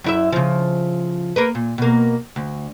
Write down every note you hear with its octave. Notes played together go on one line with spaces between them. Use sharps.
F#2 E4 E5
C#3 F3
A#3 A#4 B4
A#2
B2 A#3
D2